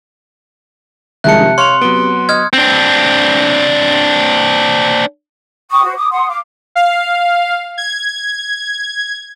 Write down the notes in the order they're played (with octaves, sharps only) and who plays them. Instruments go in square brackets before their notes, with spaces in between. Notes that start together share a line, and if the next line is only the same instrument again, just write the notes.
[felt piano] C2 G#3 [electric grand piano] D#3 F3 [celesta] E5 A5 [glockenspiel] F#6 C#7
[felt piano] C3
[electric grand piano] C#5 F5 C#6 [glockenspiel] C6 [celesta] F6 F7
[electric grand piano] F#3 B3 [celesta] D7 G7
[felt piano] D#5 [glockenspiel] D#6 F6 G#6
[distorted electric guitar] C4 D4
[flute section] G5 C#6 D#6
F#4 C5
D6 D#6
F#5 C6 D#6
F5 D6
[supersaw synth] F5
G#6